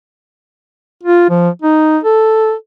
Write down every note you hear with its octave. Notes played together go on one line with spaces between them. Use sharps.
F4
F3
D#4
A4